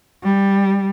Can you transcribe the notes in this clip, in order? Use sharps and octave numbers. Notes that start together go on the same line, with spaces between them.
G3